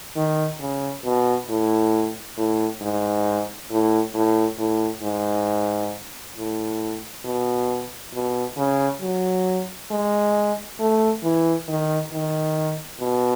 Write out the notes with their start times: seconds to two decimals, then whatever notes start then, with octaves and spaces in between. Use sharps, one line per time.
0.16 D#3
0.61 C#3
1.04 B2
1.49 A2
2.37 A2
2.81 G#2
3.70 A2
4.14 A2
4.58 A2
5.03 G#2
6.37 A2
7.24 B2
8.14 B2
8.57 C#3
9.01 F#3
9.91 G#3
10.80 A3
11.23 E3
11.68 D#3
12.12 D#3
13.00 B2